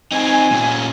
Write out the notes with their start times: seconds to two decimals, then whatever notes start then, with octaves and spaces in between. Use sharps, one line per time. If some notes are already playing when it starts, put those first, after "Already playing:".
0.12 C4 D#4 G#5
0.52 A#2 C#4